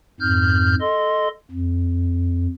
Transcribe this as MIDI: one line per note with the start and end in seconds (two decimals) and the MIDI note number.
0.20 0.75 41
0.20 0.75 44
0.20 0.75 89
0.20 0.75 91
0.81 1.28 69
0.81 1.28 75
0.81 1.28 84
1.51 2.46 41